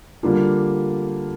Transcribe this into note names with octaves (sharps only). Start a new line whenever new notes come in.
D3 G3 A#3 D4 F4